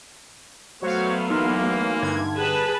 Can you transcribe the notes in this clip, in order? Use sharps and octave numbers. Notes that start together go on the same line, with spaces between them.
F#3 A3 B3 F#4 C5 C#5 F5
E3 A#3 D#4 C6 F6
G2 D3 G#6
G#4 B4 A5